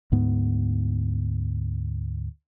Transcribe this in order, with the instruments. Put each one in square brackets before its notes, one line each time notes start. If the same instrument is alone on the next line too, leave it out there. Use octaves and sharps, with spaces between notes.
[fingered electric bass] D2 G#2 B3